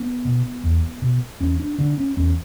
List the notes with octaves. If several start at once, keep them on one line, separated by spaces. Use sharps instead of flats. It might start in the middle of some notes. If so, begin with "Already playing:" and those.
Already playing: B3
B2
E2
B2
E2 C#4
D4
D3 D4
C#4
E2 C#4